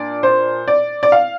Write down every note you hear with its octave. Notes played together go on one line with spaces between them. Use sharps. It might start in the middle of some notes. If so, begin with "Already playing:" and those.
Already playing: A#2 D4 D5
C5
D5
D5
F5